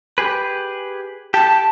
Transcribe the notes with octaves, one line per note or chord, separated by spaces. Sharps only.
G4 G#4 B4
G4 A5